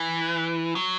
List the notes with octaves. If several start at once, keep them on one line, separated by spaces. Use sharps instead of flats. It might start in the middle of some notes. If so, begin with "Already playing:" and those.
Already playing: E3
F#3